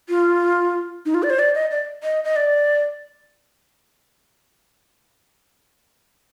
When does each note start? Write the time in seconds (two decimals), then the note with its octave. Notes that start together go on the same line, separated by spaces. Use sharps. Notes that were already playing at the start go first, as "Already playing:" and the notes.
0.09 F4
1.06 D#4
1.14 F4
1.23 D5
1.30 C5
1.39 D5
1.55 D#5
1.71 D5
2.04 D#5
2.24 D#5
2.36 D5